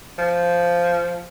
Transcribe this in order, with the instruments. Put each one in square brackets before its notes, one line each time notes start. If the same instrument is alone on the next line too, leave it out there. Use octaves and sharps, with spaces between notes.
[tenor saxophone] F3